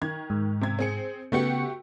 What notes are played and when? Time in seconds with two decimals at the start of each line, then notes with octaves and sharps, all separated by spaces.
0.02 D#3 G#6
0.30 G#2
0.61 C3 G#6
0.79 C4 G#4 C#7
1.32 C#3 A3 B3 F#4 G4 C#7